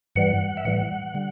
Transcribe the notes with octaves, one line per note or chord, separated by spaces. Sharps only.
G2 E3 G3 F#5
E5
A2 E3 G3 F#5
D3 G3